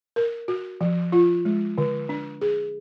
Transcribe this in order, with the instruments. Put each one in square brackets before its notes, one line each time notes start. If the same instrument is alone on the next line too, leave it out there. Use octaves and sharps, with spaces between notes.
[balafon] A#4
F#4
F3
F4
G#3
D3
D4
G#4